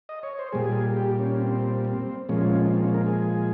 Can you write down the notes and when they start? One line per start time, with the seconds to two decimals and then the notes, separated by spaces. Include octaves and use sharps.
0.09 D#5
0.23 C#5
0.39 C5
0.52 A#2 G3 G#4
0.97 G4
1.19 C#4
1.40 C4
1.85 C4
2.29 A#2 F3 G#3 C#4
2.73 C4
2.84 C#4
2.94 A#4
3.06 G#4